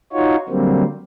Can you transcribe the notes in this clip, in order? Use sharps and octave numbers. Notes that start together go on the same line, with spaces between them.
D#4 F4 F#4 C#5
D3 F#3 G3 A#3 C4